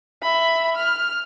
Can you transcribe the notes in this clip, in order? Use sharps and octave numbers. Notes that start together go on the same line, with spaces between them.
E5 B5
F6